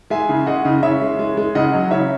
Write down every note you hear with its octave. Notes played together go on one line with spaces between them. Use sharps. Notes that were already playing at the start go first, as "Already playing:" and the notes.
G#3 E5 G#5
C#3
G#3 D#5 F#5
C#3
C#3 C#5 E5
G#3
G#3
G#3
C#3 D#5 F#5
F#3
C#3 C#5 E5